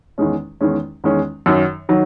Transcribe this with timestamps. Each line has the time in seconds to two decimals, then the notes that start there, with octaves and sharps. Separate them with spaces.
0.18 E2 D#3 G#3 C#4
0.61 E2 D#3 G#3 C#4
1.04 E2 D#3 G#3 C#4
1.46 F#2 D#3 F#3
1.89 D#3 F#3